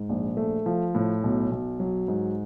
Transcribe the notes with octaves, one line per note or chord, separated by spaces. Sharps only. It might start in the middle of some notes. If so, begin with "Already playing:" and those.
Already playing: G#2
A#1
A3
F3
A2
B1
B1
F#3
G#2